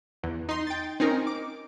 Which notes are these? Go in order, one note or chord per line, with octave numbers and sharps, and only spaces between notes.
E2
D#4 C6
G5 A6
C4 C#4 D#4 A#4
D6